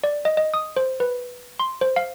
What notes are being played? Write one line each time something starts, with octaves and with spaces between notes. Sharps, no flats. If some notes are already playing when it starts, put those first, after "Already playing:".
D5
D#5
D#5
D#6
C5
B4
C6
C5
F5